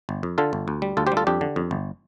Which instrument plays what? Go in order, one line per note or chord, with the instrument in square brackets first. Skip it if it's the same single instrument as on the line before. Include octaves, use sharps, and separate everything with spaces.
[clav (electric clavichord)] G1
F2
D3 F4 A4
G1
D2
G3
D2 F4 A4
G4 C5
G3
F4 A4
F2 D4 G4
D3
F2
G1